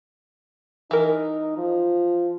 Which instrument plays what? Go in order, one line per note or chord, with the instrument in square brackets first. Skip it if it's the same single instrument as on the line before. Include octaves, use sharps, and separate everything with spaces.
[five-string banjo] E3 A#4 [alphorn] D#4
[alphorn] F3